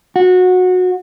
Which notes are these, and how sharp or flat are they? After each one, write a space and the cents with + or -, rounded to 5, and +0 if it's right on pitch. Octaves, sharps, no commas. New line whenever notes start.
F#4 -20